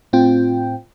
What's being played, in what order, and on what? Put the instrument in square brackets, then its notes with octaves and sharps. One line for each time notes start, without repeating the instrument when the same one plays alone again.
[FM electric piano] A2 C4 F4 G5